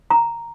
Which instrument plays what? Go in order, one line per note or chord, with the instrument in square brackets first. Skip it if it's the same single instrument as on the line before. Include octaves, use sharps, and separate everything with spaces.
[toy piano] A#5